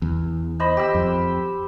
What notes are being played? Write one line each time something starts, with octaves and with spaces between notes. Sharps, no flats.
E2
C5 D#5 B5
G4 E6
F2